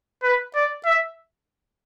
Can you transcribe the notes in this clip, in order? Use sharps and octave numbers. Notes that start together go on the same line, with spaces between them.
B4
D5
E5